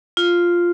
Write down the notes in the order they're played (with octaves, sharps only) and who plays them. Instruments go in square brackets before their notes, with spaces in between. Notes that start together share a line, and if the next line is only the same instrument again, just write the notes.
[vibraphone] F4